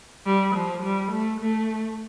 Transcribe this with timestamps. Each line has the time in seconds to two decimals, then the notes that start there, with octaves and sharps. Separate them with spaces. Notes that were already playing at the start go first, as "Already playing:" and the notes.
0.26 G3
0.55 F3
0.83 G3
1.11 A3
1.40 A3